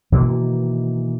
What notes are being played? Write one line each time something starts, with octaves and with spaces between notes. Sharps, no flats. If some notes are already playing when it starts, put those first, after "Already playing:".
B2 D#3 E3 A#3